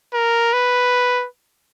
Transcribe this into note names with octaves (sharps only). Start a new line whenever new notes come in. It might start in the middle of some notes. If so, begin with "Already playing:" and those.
A#4
B4